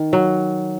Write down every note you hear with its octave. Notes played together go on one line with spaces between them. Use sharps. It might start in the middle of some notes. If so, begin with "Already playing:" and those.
Already playing: D#3
F#3